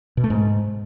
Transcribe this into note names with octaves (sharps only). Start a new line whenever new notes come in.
B2
A3
G#2